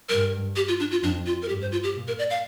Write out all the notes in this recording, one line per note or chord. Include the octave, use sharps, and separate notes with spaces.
G2 A#4
G4
F4
D4
F4
F2 D4
F4
A#4
G2 G4
C5
F4
G4
A#2
A#4
D5
F5